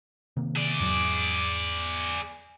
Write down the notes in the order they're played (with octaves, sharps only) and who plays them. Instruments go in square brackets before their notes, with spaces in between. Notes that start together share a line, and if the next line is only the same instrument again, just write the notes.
[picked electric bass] C3 D#3 A#3
[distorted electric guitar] G#4 D5
[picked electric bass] E2 G#2 F#3